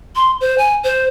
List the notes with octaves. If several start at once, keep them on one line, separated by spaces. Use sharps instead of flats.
C6
C5
G#5
C5